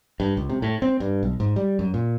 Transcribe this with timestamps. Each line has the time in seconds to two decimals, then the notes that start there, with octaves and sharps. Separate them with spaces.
0.20 G2
0.37 C#2
0.50 C3
0.62 A2
0.82 C4
1.00 G2
1.23 B1
1.40 G#2
1.56 G3
1.79 F#2
1.94 A#2